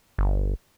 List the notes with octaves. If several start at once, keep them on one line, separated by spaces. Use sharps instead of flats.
G1